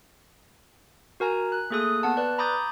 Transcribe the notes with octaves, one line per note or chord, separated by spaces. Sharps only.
F#4 A#4 G#5 A#5
F#6
A3 A#3 G#4 A4 D#6 F#6
B3 F#5 A5
B4 D5 F#6
A#5 B5 D6 D#6 G6 A6